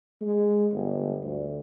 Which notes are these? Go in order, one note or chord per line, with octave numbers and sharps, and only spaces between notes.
G#3
G1
D2